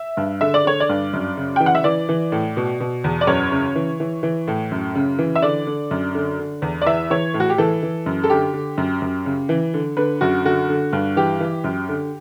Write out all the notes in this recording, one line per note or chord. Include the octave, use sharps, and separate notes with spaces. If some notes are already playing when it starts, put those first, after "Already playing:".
Already playing: E5
G2
D3 E5
D5
D3 C#5
D5
G2
F#2
C#3
G5
E3
F#5
E5
E3 D5
E3
A2
B2
B2
E2
D5
F#2 C#5
C#3
E3
E3
E3
A2
F#2
C#3
E3
E5
D3 D5
D3
F#2
D3
D3
E2
D5
E3 E5
E3 C#5
A2
F#4
G4
E3 A4
E3
F#2
A4
D3 G4
D3
F#2
F#2
C#3
E3
D3
D3 B4
F#2 F#4
D3 F#4
D3
G2
E3 G4
E3
F#2
D3